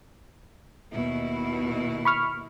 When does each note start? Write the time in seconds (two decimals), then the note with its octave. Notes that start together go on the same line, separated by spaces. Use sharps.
0.92 D#2 B2 E4
2.05 B5 C#6 F6